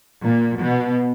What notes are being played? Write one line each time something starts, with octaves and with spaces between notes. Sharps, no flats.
A#2
B2